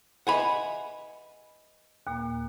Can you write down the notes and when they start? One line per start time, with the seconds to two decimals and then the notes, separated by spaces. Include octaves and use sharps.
0.27 B4 D#5 E5 F#5 G#5 B5
2.07 D#2 A#2 A#3